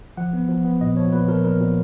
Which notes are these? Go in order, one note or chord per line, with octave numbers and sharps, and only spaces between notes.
F3 F#5
B3
F3
B3
A#2 D#5
F3 C#5
A#2 B4
F3 A#4
A#2 A#4
A#2